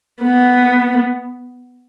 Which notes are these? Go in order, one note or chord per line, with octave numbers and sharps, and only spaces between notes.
B3